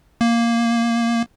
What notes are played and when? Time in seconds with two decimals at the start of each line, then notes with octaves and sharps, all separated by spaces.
0.21 A#3